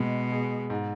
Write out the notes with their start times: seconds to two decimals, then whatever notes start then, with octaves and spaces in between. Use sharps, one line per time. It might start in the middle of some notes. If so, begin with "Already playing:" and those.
Already playing: B2 G#3
0.32 G#4
0.70 G#2